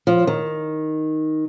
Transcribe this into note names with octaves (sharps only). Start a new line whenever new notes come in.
F3
D#3